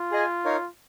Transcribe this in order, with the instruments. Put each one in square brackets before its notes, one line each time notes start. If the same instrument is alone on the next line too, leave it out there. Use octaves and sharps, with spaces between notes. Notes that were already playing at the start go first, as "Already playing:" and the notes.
Already playing: [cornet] F4
[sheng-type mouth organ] G#4 D#5 G#5
D#4 A#4 C#5 F5